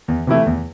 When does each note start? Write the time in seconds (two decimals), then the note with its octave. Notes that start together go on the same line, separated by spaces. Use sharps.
0.08 E2
0.27 C3 E3 A3 E4
0.46 E2